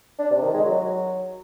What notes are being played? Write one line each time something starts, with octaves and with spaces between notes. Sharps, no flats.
D4
C3
D#3
G#3
F#3